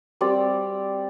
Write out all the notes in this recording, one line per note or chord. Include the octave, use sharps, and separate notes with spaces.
G3 C4 D5